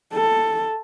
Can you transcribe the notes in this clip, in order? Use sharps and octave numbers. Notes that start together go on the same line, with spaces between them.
A4